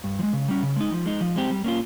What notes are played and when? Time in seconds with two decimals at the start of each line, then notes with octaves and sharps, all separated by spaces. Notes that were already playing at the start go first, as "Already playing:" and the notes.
0.04 G2
0.19 F3
0.23 G#3
0.33 C#3
0.48 G3 C#4
0.63 C#3
0.77 G#3 D#4
0.92 F3
1.06 G#3 D#4
1.21 F3
1.36 G#3 C4 G4
1.50 G3
1.64 A#3 C#4 F4